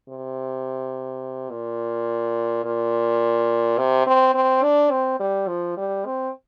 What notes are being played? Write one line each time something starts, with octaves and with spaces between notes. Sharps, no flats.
C3
A#2
A#2
C3
C4
C4
D4
C4
G3
F3
G3
C4